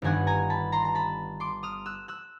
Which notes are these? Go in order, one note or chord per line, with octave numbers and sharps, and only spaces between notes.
G1 G2 D#3 G3 B3 F#5 G#5
G#5 A#5
A5 B5
A#5 C6
A#5
A5 B5
C6 D6
D#6 F6
E6 F#6
E6 F#6